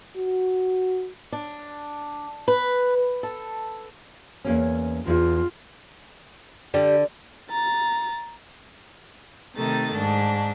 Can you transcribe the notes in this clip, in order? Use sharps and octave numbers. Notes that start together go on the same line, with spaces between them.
F#4
D4
B4
A4
E2 A#3 C#4
E2 F4
D3 G3 D5
A#5 A6
C3 D#3 A3 D#4 A6
G#2 D4